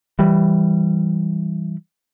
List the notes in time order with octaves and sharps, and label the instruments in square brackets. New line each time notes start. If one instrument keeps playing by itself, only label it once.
[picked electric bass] E3 G3